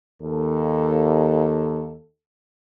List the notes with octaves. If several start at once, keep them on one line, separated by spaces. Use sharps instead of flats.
D#2 A4